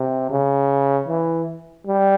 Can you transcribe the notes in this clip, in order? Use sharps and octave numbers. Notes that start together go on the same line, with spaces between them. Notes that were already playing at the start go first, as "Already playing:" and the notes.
Already playing: C3
C#3
E3
G3